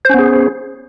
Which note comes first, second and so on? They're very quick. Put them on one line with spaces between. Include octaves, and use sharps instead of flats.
C5 C#4 B3 G#4